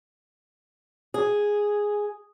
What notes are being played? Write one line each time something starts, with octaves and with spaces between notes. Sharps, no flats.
G#4